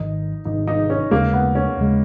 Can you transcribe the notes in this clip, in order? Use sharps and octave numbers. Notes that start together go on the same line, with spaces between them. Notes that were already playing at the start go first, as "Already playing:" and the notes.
Already playing: G#1 G#2 D#3 D#4
G#1 G#2 D#3 D#4
D#4
C#4
D#2 C#3 G#3 A#3
B3
C#4
D#2 C#3 G#3